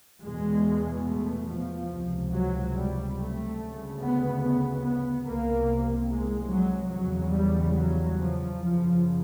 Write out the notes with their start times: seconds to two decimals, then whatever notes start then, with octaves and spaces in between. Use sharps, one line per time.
0.23 E2 B2 G#3
1.07 A3
1.49 F3
1.91 C#2 C3
2.33 F#3
2.75 G3
3.17 A3
3.58 D2 C#3
4.01 B3
4.43 B3
4.84 B3
5.26 C2 C3 A#3
6.10 G#3
6.52 F#3
6.94 E2 C#3 F#3
7.36 G3
7.77 F#3
8.19 F3
8.61 F#2 C#3 F3